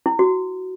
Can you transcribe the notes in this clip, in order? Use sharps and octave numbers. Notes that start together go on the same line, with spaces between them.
E4
F#4